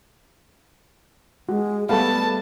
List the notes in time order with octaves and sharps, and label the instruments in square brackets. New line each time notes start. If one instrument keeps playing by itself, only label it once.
[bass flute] G#3 [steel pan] F#4
[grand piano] G3 B3 [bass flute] A3 [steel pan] A4 F5 [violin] A5